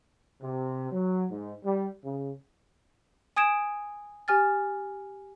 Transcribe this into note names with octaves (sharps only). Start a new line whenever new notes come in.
C3
F#3
G#2
G3
C#3
G#5 D#6 G#6 D7 E7
G4 G#5 F6 A6